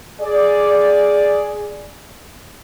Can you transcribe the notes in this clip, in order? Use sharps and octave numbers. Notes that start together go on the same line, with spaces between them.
G#4 D5